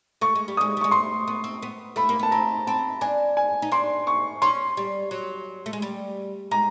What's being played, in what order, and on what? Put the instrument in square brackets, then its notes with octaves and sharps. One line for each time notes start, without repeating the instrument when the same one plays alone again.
[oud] A3 [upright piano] C#6
[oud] G#3
G3
[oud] G#3 [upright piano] D#6
[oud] G3
[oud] G#3 [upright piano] C#6
[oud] A3 [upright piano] C6
[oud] B3
C4
B3
[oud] A3 [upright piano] B5
[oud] A#3
[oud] B3 [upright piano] A5
[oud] C4 [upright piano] A#5
[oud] C4 [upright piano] A5
[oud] D4 [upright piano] G#5
[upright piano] G#5
[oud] D#4
[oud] D4 [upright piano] C6
[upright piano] C#6
[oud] C#4 [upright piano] C6
[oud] G3
F#3
A3
G#3
G3
[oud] G#3 [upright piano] A#5